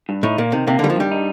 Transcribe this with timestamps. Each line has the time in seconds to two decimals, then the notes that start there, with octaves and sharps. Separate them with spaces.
0.09 G2
0.23 A2 D#4
0.38 A#2 A#3
0.52 C3 D#3
0.67 C3 A#3
0.79 D3 D#3 G3
0.90 F3
0.96 G2 G3
1.11 D#4